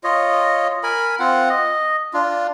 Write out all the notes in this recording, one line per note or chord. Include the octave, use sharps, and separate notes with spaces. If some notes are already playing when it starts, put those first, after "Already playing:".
F4 C#5 D#5
A#4 G#5 B5
C4 F4 F#5
D#5
D4 F4